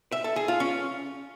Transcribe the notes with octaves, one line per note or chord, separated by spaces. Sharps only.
E5
A4
G#4
F4
C#4